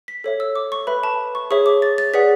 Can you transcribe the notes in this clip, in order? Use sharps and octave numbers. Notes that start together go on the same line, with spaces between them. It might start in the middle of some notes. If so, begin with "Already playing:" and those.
B6
A4 C#5 E5
E6
D6
C#6
B4 E5 B5
A5
C#6
G#4 C#5 E5 C#6
D6
A6
A6
G#4 B4 D5 F#5 B6